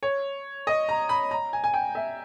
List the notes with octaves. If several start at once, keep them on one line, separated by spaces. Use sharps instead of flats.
C#5
D#5
A#5
B5
A#5
G#5
G#5
G5
E5